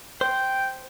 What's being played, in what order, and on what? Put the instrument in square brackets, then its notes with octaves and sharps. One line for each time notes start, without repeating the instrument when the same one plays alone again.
[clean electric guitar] C5 [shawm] G5